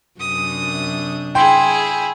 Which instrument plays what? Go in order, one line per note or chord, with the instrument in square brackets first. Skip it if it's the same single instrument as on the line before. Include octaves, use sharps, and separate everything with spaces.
[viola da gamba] F#2 C3 D4 [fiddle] D#6
[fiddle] E4 G#4 [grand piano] G5 C6